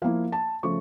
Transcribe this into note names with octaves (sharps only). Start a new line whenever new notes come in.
F3 A#3 E4 F5
A5
C#3 F3 A3 C#6